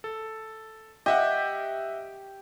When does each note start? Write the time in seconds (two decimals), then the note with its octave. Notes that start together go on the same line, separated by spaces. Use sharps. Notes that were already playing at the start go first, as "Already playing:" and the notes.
0.04 A4
1.06 G4 D#5 E5 F#5